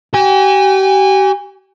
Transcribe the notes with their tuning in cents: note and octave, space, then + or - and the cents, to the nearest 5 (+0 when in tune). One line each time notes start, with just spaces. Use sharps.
G4 -40 G#5 -30